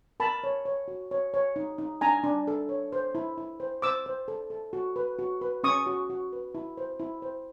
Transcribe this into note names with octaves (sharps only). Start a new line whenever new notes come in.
A#4 A5 B5
C#5
C#5
F#4
C#5
C#5
D#4
D#4
D4 G#5 A#5
D4
A4
C#5
C5
E4
E4
C5
C5 D6 E6
C5
A4
A4
F#4
B4
F#4
B4
C#4 C#6 D#6
F#4
F#4
B4
E4
C5
E4
C5